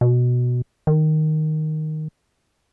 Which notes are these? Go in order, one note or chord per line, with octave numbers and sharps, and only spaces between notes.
B2
D#3